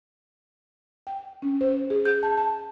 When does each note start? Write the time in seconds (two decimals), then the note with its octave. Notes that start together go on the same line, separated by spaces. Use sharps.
1.07 G5
1.42 C#4
1.61 C5
1.90 G#4
2.05 G6
2.23 A5
2.37 A5